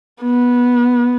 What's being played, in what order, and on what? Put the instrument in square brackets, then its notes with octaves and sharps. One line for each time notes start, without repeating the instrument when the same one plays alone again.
[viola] B3